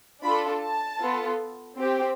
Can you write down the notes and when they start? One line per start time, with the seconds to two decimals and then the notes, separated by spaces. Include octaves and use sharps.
0.22 D4 F4 A4 B5
0.62 A5
1.00 B3 F4 A4
1.77 C4 G4